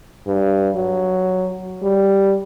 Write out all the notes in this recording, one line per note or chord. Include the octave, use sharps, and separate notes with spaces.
G2
F#3
G3